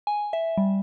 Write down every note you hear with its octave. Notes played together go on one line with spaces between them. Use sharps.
G#5
E5
G3